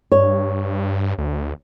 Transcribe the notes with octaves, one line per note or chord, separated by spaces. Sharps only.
G2 C#5
D2